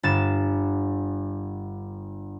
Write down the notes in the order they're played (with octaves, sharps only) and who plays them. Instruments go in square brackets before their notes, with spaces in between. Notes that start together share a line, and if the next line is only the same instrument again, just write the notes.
[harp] G1 A6 E7